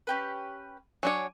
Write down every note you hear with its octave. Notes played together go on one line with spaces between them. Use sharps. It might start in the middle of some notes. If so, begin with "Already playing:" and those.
C#4 G4 B4
F#3 D4 C#5 G#5 A#5 D6